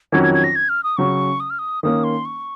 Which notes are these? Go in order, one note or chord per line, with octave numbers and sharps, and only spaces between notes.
F2 D#3 F#3 C#4 G#6
G#6
G#6
A#6
G#6
F6
D#6
C#3 F#3 C#4 C#6
D#6
F6
D#6
D#3 A#3 C#4 D#6
C6
C#6